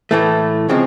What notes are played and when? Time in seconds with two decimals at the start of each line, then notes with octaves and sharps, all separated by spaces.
0.11 A2 E3 A3
0.69 C#3 F3 G#3 C4